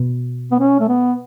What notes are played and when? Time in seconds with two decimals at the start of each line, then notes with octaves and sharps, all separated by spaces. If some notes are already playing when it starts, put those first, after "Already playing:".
Already playing: B2
0.51 B3
0.59 C#4
0.80 A3
0.88 B3